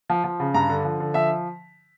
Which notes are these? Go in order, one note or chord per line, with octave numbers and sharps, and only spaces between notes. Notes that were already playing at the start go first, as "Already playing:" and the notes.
F3
F3
C#3
G2 A#5
D3
F3
D3
F3 E5